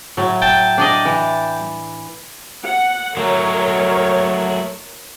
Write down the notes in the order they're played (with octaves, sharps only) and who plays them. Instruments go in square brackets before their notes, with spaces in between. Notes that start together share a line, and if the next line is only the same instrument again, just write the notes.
[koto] A2 F#3
[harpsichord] G5 A5
[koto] D4 D5 D#5
E3
[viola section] F#5
[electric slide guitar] F#3 A3 F#4 [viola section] A#4 C#5